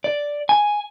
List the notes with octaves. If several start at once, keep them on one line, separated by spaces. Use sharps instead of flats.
D5
G#5